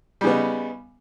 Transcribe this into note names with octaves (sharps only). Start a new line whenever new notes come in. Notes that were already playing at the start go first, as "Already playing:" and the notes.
C#3 G3 B3 D#4